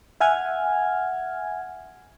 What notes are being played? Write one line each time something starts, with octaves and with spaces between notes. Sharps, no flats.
E5 F#5 G#5 F6 G#6